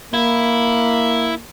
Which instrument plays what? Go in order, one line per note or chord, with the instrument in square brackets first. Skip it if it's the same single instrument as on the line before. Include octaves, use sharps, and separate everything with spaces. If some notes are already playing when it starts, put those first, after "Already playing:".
[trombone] A#3 [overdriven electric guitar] E4